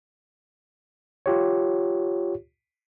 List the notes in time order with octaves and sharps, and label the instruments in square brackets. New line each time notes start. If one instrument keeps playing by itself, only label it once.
[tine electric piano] F4 G4 C#5